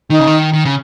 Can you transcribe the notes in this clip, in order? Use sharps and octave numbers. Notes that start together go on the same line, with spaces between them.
D#3 D#4
C#3
D#3
D#3
C#3